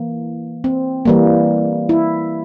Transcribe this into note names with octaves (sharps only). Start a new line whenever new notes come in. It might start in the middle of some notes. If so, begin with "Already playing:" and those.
Already playing: E3 A#3
C4
E3 G3 A#3
E4